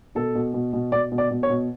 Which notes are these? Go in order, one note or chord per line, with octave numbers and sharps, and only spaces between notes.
B2 A4
B2
B2
B2
B2 D5
B2
D5
B2
C#5
B2